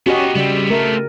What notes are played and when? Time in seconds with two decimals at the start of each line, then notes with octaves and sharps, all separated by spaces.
0.06 B3 C#4 D#4 F#4 G4 D#5
0.36 C#3 G3 B3 C4
0.70 A3 A#4